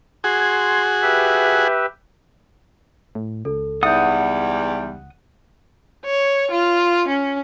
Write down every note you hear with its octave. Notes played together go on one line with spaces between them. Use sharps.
F#4 G#4 C6 G#6
G4 B4 E5
A2
C#2 A4
E2 G3 D#4 E5 F#5 D#6 G6
C#5
F4
C#4